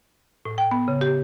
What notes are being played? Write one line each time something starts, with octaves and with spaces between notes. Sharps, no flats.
A2
G5
B3
C#3
G4